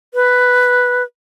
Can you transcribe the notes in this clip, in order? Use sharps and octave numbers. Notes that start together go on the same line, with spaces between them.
B4